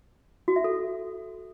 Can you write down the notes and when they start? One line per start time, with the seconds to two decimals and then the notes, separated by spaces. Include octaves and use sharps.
0.48 F#4
0.56 E5
0.64 A4